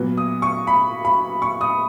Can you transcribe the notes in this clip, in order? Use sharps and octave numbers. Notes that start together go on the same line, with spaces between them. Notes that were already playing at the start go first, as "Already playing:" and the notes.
Already playing: A#2 F#3 B3
D#6
C#6
B5
B5
C#6
D#6